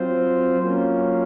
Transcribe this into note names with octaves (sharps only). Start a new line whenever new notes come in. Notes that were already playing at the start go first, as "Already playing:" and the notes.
Already playing: F#3 C4 F4 C5
F#3 A#3 C#4 F4